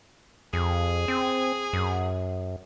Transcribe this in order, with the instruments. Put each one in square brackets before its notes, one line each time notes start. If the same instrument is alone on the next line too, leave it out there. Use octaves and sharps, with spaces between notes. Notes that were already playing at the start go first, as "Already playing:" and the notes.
[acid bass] F2 [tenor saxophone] G#4
[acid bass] C4
F#2